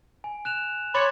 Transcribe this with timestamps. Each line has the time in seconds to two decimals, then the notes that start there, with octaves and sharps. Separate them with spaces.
0.24 G#5
0.45 F#6 E7 F7
0.94 C#5 B5 C6 D6 A6